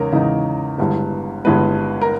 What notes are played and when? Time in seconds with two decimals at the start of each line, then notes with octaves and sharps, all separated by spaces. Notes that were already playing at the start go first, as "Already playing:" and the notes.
Already playing: E2 C#3 G#3 D#4 A#4 C#5
0.13 E2 C#3 G#3 D#4
0.78 G1 G2 E3 G#3 B3
1.45 G1 G2 E3 G#3 B3 B4
2.01 A#4